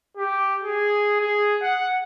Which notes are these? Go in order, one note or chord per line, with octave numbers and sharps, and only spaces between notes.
G4
G#4
G#4
F#5